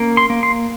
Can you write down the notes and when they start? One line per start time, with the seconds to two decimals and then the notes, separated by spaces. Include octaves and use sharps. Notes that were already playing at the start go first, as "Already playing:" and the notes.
Already playing: A#3 C#4
0.17 C6
0.30 A#3
0.43 C6